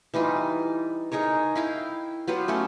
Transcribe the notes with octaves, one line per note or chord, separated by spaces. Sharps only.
E3 G3 D#4 F4
D#4 G#4 A#4 C#5
E4 F5 G5
F#3 B3 F4 G4
A3 C#4 A4